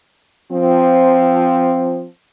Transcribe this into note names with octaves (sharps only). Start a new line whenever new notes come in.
F3 C4